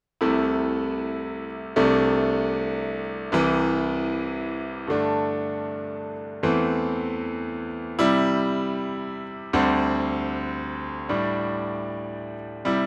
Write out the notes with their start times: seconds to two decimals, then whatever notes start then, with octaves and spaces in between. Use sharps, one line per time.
0.21 C2 C3 A3 E4
1.76 C2 C3 A3 D4
3.32 C2 C3 E3
4.87 G2 D3 A3 D4
6.43 E2 E3 A3 C4
7.99 C3 G3 E4
9.53 D2 D3 G3 C4
11.09 A2 G3 D4
12.65 C3 G3 E4